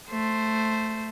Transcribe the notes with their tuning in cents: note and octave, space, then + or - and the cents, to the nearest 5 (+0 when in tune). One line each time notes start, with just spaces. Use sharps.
A3 +0 C5 +0